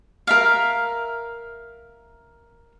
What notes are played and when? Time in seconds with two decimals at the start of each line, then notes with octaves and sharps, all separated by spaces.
0.27 A#4 E5 F5